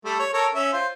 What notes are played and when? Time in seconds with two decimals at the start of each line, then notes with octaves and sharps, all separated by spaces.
0.05 G3 A3
0.20 C#5
0.33 A4 A#4 C#5
0.55 C#4 E5
0.73 F4 C5